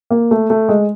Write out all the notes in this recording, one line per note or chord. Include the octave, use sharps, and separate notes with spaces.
A#3
A3
A3
G#3